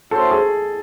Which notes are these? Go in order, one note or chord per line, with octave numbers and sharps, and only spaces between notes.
A3 C#4 F#4 A4 C5
G#4